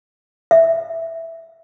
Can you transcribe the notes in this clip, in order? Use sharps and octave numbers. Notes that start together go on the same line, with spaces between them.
E5